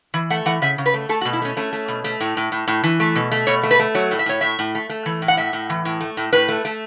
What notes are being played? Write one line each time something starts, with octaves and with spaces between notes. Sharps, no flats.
E3
A3 F#5
E3 F#5
C#3 E5
C#3
B4
A3
A3 A4
F#4
B2
E4
A3 C#4
A3 C#4
A3
B2
A3
A2
A2
A2
A2
E3
A3
B2
A3
B2 C#5
A3
B4
A3
F#3 C#5
A2
E5
A2 C#5
A2 E5
A2
A3
A3
E3
A2
F#5
A2 E5
A2
E3
A2
A3
A2
A2 B4
A3
A3